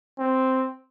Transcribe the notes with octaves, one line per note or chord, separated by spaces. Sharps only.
C4